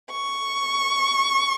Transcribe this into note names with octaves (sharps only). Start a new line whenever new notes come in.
C#6